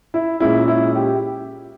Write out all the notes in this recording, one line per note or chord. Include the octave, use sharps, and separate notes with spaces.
E4
A#2 G#3 C#4 E4
E4
G4